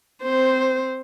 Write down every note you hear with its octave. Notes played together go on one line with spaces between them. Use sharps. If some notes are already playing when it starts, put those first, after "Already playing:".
C4 C5